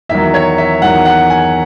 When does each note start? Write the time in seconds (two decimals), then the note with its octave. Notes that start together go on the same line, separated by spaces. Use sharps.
0.09 E2 D#3 F#3 E5
0.34 C#5
0.58 E5
0.82 E2 D#3 F#3 F#5
1.05 F#5
1.30 G#5